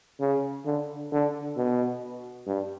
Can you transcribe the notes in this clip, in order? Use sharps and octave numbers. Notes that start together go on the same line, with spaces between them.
C#3
D3
D3
B2
G2